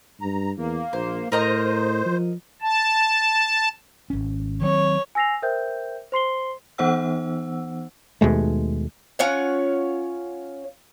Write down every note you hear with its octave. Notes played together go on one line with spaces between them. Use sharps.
G2 A#5
E2 A#3
A#1 C5
A2 A#4 C5 D#5 A#5
F3
A5
G#1 C#4
D#3 F#3 C4 C#5
G#5 E6 A#6 C7 F7
A#4 C5 E5 G5 G6
C5 C6 C7 G7
E3 B3 D#4 C5 F#5 E6
D#2 B2 G#3 A3
C#4 F4 C#5 F#5